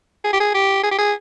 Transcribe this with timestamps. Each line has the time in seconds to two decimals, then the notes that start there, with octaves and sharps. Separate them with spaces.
0.24 G#4
0.33 G4
0.40 G#4
0.54 G4
0.83 G#4
0.91 G4
0.98 G#4